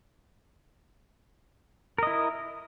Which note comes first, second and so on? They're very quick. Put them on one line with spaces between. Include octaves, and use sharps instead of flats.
A#4 D#5 E4